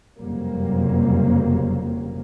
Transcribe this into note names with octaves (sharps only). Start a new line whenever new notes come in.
F#1 F2 C3 F#3 G3 A#3